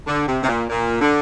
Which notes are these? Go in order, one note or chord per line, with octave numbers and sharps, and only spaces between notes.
D3
C3
C3
A#2
A#2
D3